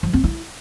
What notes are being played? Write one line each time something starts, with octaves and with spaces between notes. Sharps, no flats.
F3
C4
E4